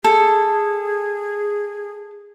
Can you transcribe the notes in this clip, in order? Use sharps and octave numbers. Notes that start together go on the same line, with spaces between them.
G#4 A4